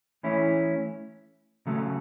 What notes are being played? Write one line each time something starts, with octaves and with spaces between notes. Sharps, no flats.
E3 A3 C#4 E4
C#3 F#3 A3